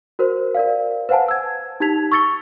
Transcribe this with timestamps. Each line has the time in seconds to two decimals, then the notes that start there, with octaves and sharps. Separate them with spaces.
0.19 F#4 A#4 C5
0.55 A#4 D5 F5
1.09 B4 C5 F5 F#5 G#5 A5
1.28 E6 G#6
1.80 D#4 G4 A5 G#6 B6 F7
2.12 C#6 E6 A6 C#7 G7